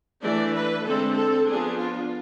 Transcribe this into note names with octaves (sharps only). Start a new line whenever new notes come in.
E3 A3 D4 D5
B4
D3 G#3 C4 A4
A4
F3 B3 D4 G#4
F4